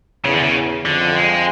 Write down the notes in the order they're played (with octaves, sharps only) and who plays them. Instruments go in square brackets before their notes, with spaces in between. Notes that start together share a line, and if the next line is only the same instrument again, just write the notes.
[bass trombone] E2 [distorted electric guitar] C#3
[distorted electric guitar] D3
C#3
[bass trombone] F2 [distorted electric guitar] D3
[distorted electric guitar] G#3